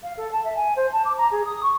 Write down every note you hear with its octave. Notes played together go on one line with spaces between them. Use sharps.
F5
A4
A5
E5
G#5
C5
A5
D6
A#5
G#4
D#6
C#6